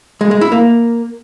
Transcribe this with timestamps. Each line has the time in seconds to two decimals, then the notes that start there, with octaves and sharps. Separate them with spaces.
0.21 G#3
0.31 G#3
0.41 E4
0.52 A#3